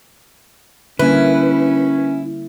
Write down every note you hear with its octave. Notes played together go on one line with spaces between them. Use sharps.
D3 G3 A#3 C#4 E4 B4